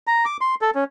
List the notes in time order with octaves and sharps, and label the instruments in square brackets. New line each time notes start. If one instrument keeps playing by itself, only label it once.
[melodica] A#5
D6
C6
A4
C#4